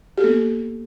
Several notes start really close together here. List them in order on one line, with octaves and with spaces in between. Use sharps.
G4 A4 A#3 B3